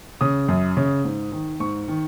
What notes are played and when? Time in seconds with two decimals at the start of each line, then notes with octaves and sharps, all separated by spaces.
0.21 C#3 D#6
0.48 F#2
0.77 C#3
1.05 G#2
1.32 D#3
1.60 G#2 C#6
1.88 D#3